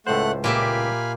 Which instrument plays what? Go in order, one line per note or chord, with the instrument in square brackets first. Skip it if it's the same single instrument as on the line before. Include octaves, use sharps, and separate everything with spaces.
[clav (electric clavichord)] C#2 A2 C5 [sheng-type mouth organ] A3 F#5 F#6
[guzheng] A#2 G4 E5 [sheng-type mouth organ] F5 G#5 B5